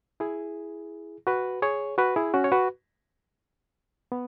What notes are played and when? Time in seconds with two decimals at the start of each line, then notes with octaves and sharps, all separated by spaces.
0.20 E4 G#4
1.27 F#4 B4
1.62 G#4 C#5
1.98 F#4 B4
2.16 E4 G#4
2.34 C#4 F#4
2.44 C#5
2.52 F#4 B4
4.12 B3